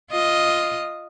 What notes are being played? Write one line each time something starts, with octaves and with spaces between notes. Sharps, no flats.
F4 D#5